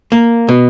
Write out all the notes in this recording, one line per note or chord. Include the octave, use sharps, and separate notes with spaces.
A#3
B2